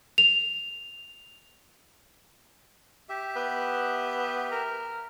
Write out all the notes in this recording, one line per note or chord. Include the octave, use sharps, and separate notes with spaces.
F7
G4 E5
B3
A#4